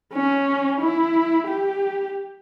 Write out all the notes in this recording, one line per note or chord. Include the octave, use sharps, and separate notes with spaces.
C#4
E4
G4